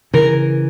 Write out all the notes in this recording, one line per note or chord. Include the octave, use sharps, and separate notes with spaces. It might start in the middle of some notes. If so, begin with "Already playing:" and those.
C#3 E3 A#4